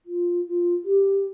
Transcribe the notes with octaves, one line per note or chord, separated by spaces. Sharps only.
F4
F4
G4